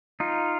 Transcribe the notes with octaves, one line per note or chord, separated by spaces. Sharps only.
D#4 F4